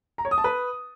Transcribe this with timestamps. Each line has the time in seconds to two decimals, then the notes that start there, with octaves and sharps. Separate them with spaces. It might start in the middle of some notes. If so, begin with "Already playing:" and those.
0.18 A#5
0.25 C#5
0.31 D#6
0.38 A5
0.44 B4